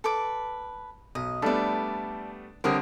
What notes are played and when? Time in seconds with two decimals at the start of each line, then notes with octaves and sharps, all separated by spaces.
0.04 A4 B4 D6
1.15 B1 D#5
1.42 G3 A3 B3 D4 A4 D5
2.64 D3 G3 C4 A#4 C#5 D#5